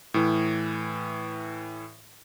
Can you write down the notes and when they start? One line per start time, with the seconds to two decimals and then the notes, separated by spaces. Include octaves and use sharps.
0.14 A2 E3